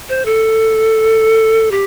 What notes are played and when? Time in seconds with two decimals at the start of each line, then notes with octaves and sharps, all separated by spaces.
0.09 C5
0.25 A4
1.71 G4